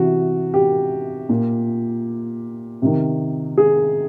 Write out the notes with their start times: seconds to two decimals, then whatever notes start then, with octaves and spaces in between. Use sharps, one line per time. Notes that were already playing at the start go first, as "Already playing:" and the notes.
Already playing: C3 E3 F#4
0.54 G4
1.29 A#2
2.82 C3 D#3
3.58 G#4